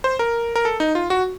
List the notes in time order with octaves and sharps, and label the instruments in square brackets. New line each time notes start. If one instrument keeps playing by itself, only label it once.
[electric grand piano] C5
A#4
A#4
A4
D#4
F4
F#4